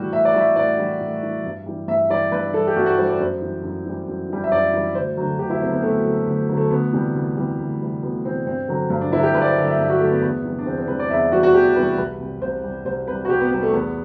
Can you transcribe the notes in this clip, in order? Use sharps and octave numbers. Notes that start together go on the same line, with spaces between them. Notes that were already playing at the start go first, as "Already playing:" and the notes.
Already playing: A2 E3 G3 F#4
A2 E5
D5
E3 G3 E5
A2 D5
E3 G3
A2
E3 G3
G2
E3 G3
G2 E5
E3 G3 D5
G2 B4
E3 G3 A4
G4
G2 F#4
F#4
E3 G3 C5
D5
F#2 C5
E3 G3
F#2
E3 G3
F#2
E3 G3
E5
F#2 D5
E3 G3
D2 C5
D3 F#3
D2 G4
E4
D3 F#3 C4
B3
D2 A3
D3 F#3
D2
D3 F#3
A3
D2 B3
C3 E3 G3
D2
C3 E3 G3
D2
C3 E3 G3
D2 B3
C3 E3 G3 C4
G2 C4
D3 F#3
G2
D4
D3 F#3 E4
G4
G2 B4
D5
C5
D3 F#3
E5
G2
F#4
D3 F#3 A3
B3
E2 B3
C3 E3 G3
D4
E2 C4
C4
C3 E3 G3 B4
D5
E2 E5
C3 E3 G3 F#4
F#4
E2 G4
C3 E3 G3 B4
C2 B4
C3 G3
C2 C5
C3 G3
C2 C5
C3 G3 B4
F#4
C2 G4
B3
C3 G3 B3
A3
E2 B3